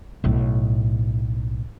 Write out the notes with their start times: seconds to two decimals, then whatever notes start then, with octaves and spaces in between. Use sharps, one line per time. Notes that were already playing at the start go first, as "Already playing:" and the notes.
0.24 B1 A2